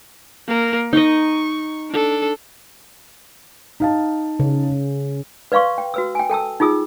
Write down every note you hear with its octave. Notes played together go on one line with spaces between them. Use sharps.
A#3 A#4
D#4 D#5 C#6
D4 A4
D#4 F5 A5
C#3
B4 D5 F5 C6 C#6
G5
F#4 B4 E6
G5 G#5
A4 G5 A5 E6
D#4 F4 G#4 D#6 E6